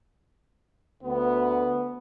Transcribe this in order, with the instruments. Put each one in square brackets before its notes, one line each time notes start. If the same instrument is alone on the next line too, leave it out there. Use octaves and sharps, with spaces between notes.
[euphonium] D2 [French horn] B3